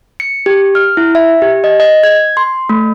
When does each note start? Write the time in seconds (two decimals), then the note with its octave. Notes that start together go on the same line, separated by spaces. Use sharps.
0.20 C#7
0.46 G4
0.75 F6
0.97 E4
1.15 E5
1.42 G4
1.64 D#5
1.80 D#5
2.03 G#6
2.37 C6
2.69 A3